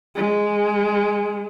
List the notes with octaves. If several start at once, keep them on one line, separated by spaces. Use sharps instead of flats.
G#3